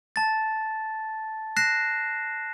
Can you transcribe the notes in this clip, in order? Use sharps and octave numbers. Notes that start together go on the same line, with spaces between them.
A5 A6
F#6 A#6 C7 E7